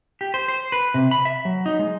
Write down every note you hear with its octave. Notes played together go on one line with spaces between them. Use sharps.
G4
C5
C5
B4
C3
B5
E5
F#3
D#4
G#3